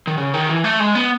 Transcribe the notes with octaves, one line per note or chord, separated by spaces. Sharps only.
D#3
C#3
D#3
E3
A3
G#3
B3